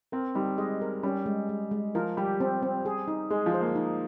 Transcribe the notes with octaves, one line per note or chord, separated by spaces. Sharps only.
C4 A#4
G3 D#4
G#3 D#5
A#4
G3 C#4
G#3
G#3
G#3
F3 A#4
G3 G4
C4
C4
G#4
D#4
G#3 G#4
F3
C5
A#3
D#4